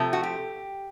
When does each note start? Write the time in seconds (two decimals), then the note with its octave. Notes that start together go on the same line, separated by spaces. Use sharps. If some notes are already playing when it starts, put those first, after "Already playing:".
Already playing: C3 F3 A3
0.13 F#4
0.23 G4